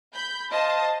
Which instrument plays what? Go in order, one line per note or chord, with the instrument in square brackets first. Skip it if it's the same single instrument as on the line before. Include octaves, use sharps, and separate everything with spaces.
[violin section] B5 G6
[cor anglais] F4 [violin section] C5 A5 [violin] D#5